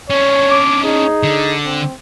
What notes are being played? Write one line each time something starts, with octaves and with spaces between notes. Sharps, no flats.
C#4 D4 C#5
D6
D#4 G#4
D3
C4